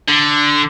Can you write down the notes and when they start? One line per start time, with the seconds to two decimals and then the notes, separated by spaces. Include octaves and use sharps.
0.08 D3